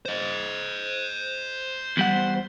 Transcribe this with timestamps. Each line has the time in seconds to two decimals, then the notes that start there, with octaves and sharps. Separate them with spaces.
0.05 C5 D#5
1.97 E2 G3 F#5